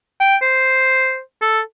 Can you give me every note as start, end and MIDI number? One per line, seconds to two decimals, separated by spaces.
0.20 0.36 79
0.42 1.20 72
1.42 1.60 69